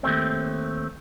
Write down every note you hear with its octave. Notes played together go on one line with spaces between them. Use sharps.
D#2 A3 C4